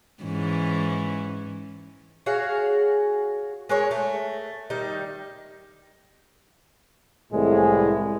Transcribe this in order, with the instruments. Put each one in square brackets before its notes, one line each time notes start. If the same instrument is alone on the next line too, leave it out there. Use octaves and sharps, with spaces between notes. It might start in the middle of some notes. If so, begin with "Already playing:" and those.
[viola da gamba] G#2 E3 C#4
[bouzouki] F#4 G#4 C#5 F5
G#3 A#4 C#5
A3
D#3 G3 D#4
[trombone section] C2 A2 E3 G#3 A3